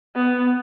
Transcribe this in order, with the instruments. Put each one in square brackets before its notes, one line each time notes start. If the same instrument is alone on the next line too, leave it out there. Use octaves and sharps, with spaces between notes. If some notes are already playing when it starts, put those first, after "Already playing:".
[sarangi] B3